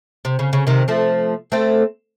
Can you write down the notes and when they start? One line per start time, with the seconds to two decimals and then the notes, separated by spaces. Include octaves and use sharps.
0.25 C3
0.39 C#3
0.53 C#3
0.67 C3 D#3
0.88 F3 A3
1.52 A3 C4